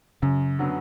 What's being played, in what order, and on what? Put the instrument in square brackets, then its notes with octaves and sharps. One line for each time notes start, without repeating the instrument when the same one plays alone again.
[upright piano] F#2 [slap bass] C#3
[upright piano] D3 F#3 B3